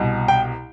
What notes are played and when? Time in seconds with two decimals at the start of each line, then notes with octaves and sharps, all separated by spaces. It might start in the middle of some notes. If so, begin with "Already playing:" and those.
Already playing: C2 B2
0.28 G5